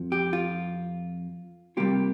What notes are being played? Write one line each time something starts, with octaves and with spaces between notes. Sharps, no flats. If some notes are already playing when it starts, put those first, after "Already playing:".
Already playing: F2 F3
G4
F4
C3 G3 A#3 F4 G4